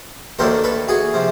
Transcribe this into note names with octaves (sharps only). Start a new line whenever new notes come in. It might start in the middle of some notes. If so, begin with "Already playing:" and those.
D#2 D#3 F#3 A3 D4 A#4 C5
A4 B4
F#4 G#4
C3 F3